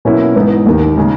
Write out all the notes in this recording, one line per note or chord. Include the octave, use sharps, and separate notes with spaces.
B2 F#3 A#3 C#4 E4
G#2 E3 B3 D#4
D#2 D#3 A#3 D#4
C#3 G#3 D#4